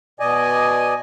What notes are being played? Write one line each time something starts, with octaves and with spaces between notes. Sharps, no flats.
B2 D5 D#5 G#5